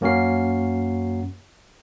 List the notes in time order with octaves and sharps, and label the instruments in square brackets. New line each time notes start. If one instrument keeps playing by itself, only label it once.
[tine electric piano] F#2 A#3 C#4 F#4 A#4 C7